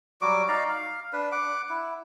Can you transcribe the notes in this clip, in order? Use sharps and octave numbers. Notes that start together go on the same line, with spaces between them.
F#3 G3 F#4 D6
D#4 D5 F5 A#5
F5
D4 B4
F#5 D6
E4